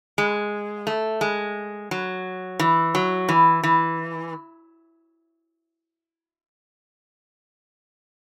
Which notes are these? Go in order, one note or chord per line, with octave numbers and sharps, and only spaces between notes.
G#3
A3
G#3
F#3
E3
F#3
E3
E3